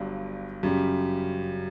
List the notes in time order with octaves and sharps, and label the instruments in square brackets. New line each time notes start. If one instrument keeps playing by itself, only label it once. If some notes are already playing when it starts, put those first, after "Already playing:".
Already playing: [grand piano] G1 G2 F#3
F#2 C#3 G3